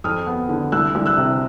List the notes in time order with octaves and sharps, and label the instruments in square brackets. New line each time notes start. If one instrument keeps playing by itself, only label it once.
[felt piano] F2 D#6 F6
B3
D3
C2 E6 F#6
C2
E6 F#6
C3